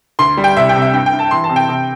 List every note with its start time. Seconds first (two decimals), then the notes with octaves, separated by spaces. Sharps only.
0.19 D2 C6
0.37 G3
0.44 G5
0.57 C2 E5
0.69 G5
0.76 C3
0.82 E5
0.94 G2 G5
1.06 G5
1.13 G2
1.19 A5
1.31 E3 C6
1.44 A5
1.50 C3
1.56 G5
1.69 C3